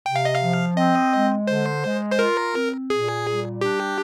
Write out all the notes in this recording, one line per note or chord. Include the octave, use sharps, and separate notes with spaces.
C3 G5
F5
D#5
F5
F3
C4 D#5
G#3
D3 C5
G#3
C5
F4 A#4
C4
A#2 G#4
G3
D4 G4